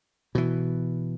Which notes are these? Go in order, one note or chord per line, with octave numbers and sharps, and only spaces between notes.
B2 E3